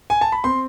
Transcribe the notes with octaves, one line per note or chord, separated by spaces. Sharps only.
G#5
A5
B5
C4 C6